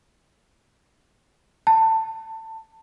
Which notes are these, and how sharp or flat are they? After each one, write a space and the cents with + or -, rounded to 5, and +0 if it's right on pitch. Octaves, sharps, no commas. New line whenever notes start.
A5 +20